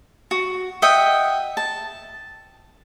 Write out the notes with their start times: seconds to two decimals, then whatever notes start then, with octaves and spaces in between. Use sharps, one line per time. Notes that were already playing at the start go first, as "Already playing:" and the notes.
0.31 F#4
0.82 D#5 E5 F#5 G5
1.57 A5